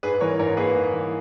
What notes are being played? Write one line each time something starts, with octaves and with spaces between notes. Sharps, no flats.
G#2 G#4 B4
E3 A#4 C#5
G#2 A#4 C#5
A#3 G#4 B4
G#2
E3